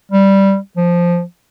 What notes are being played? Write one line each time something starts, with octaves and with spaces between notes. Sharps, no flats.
G3
F3